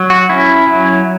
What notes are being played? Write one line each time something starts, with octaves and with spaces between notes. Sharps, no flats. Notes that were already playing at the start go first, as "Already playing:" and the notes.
Already playing: F#3
F#4
C#4 E4
F#3